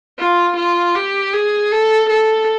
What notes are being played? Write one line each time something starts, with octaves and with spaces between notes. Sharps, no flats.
F4
F4
G4
G#4
A4
A4